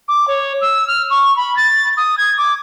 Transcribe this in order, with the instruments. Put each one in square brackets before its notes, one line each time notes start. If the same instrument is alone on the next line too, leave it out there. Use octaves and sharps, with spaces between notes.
[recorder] D6
C#5
E6
F6
C#6
B5
A6
D#6
G#6
D6